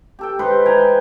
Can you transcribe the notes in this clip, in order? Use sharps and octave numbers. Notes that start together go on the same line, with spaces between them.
G4 A4 G5
G#2 G4 B4 C5
E3 G5 G#5 A#5